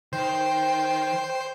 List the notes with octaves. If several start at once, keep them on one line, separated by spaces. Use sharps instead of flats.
D#3 C5 G5